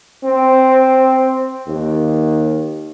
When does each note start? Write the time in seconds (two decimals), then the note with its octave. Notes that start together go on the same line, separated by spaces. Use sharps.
0.24 C4
1.67 D#2